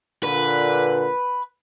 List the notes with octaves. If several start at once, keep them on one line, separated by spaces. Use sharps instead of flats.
A#2 D3 B4